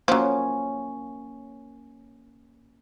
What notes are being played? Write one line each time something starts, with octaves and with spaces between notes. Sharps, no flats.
F3 F#3 A#3 C#4